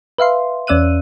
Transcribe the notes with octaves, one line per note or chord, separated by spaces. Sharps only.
B4 E5 F5 C6
E2 C#4 D5 E6 F#6 D#7